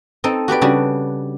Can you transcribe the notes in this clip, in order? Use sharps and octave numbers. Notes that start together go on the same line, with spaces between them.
C4 D#4 A4
F#4 G4 B4 D5
C#3 G3 D4 F#4